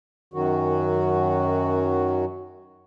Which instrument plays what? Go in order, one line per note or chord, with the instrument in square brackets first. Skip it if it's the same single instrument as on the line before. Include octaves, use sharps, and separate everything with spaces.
[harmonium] F#2 D#3 F#3 F#4